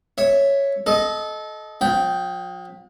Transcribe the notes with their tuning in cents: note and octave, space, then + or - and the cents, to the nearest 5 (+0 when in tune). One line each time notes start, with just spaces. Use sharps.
C#5 +0 E5 +0
A4 -25 D#5 +5
F3 +45 G5 -5